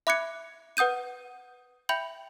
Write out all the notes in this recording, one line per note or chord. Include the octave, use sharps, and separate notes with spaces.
E5 B5 D6 F#6 G#6 C#7
B4 F#5 D#6 G6 D#7
E5 G5 B5 G6 F7 F#7